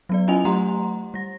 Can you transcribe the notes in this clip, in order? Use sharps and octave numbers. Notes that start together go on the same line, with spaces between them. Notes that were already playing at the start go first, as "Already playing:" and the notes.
F#3 B3 D5
C#4 E4 F4 D#5 G#5 F7
F#3 A3 G4 F#5 A#5 C6
G3 A#6